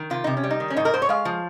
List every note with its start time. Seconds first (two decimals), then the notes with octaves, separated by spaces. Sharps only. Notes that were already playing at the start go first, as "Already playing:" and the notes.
Already playing: D#3
0.10 C3 F4
0.24 C3 D#4
0.37 C#4
0.44 G3
0.51 D#4
0.60 D#3
0.70 C#4
0.77 G#2 D#4
0.85 A#4
0.94 G#2 C5
1.02 C#5
1.09 G#3 F5
1.25 F3